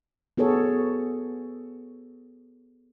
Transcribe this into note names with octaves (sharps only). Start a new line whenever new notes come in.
B3 F#4 G#4 A4 C#5